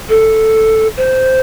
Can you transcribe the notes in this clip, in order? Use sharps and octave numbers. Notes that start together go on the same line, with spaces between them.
A4
C5